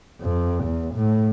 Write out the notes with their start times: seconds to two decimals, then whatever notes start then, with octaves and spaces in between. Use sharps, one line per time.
0.21 F2
0.64 E2
0.95 A2